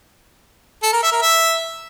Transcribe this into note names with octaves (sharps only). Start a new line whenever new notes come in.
A4
A#4
E5
A#4
E5